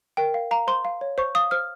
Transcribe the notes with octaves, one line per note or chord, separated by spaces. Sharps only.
A#4 G5
F5
F5 A#5
C5 C6
F5
C#5
C5 C#6
F5 D#6
C5 F6